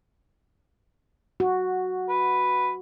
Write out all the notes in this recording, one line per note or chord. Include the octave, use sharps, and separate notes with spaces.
F#4
B4